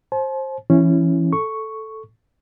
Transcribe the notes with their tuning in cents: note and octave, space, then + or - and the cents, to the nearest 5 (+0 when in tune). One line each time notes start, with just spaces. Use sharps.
C5 +25 A5 -45
E3 +25 C#4 -10 E4 +0
A4 +0 C#6 +0